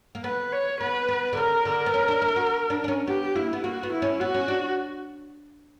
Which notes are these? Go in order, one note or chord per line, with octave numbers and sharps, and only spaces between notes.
A#3
B3 B4
C#5
B3 B4
B3
D3
C#3 A#4
D3 A#4
B3
C#4
D4
E4
F#4
D4
D4
C#4
B3 G4
A#3 E4
B3
A#3 F#4
B3
E4
C#4
B3 F#4
C#4
D4